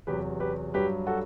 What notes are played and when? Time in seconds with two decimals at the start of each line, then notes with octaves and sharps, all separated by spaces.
0.07 E2 C3 F#3 G4 B4
0.40 G4 B4
0.74 G2 F#3 G4 B4
1.07 F#4 A4